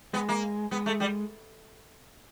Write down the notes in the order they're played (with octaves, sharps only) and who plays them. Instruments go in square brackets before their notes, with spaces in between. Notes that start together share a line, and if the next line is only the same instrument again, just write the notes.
[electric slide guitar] G#3 [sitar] B3
[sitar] A#3
[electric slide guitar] G#3 [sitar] B3
[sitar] A3
G3